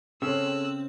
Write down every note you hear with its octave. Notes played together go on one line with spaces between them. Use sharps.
C#3 C4 G#4 A4 C#5 E6 F#6